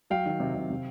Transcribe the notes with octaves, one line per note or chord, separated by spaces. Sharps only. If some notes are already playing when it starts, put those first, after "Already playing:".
F#3 F5 G5
D#3
C3
C3
C3